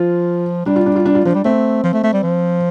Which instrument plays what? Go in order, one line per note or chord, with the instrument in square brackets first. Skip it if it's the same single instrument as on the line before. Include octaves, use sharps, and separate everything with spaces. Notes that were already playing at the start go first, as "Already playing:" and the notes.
Already playing: [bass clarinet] F3 [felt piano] F4
[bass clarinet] G3 [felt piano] D4
[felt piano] F4
D4
F4
D4
F4
[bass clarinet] F3 [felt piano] D4
[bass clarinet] G3
[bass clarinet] A3 [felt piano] C4
[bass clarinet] F3
A3
A3
G3
F3